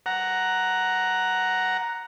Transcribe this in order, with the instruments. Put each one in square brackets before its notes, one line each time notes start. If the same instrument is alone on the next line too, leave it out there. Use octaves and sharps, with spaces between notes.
[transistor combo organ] F#5 A#5